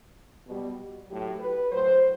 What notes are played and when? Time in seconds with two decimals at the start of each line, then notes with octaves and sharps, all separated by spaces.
0.47 B2 G3
1.09 A2 F#3 G4
1.39 B4
1.71 A2 F#3 C5